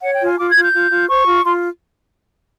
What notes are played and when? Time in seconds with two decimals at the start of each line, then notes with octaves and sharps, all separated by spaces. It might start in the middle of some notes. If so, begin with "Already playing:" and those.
0.02 C#5 F#5
0.14 G5
0.20 F4
0.26 G#5
0.38 F4 D6
0.50 G#6
0.55 F4
0.62 G6
0.73 F4
0.91 F4
1.08 C5 C#6
1.26 F4
1.44 F4 C6